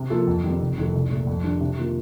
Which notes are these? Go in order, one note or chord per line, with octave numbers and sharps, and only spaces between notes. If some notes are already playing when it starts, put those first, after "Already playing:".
Already playing: C3
F3 A#3 F4 A4
F2
D#3 G3 C4
F1
F2 D#3 A3
C2
A#2 A3
F2
D#3 G3 D4
C3
D#3 A#3 F4